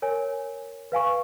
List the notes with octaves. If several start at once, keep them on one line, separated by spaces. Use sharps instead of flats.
A#4 C#5 G#5
B4 F5 G#5 C#6